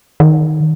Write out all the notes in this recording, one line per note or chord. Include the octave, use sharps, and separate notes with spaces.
D#3